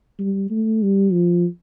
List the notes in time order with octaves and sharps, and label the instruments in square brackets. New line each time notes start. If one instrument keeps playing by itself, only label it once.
[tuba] G3
A3
G3
F3